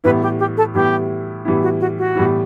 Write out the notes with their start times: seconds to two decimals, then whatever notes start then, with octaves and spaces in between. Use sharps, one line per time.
0.04 A2 E3 G3 B3 E4 B4
0.22 G4
0.39 G4
0.57 A4
0.75 A2 E3 G3 B3 E4 G4
1.45 A2 E3 G3 B3 E4
1.63 F#4
1.80 F#4
1.98 F#4
2.15 A2 E3 G3 B3 E4